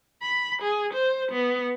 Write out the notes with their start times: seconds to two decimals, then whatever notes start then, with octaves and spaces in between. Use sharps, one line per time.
0.23 B5
0.62 G#4
0.93 C5
1.32 B3